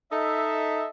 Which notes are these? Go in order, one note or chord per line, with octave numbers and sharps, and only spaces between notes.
D#4 A4 D#5 E5